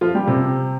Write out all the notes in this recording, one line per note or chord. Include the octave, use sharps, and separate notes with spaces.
F3 F4
G3 G4
C3 C4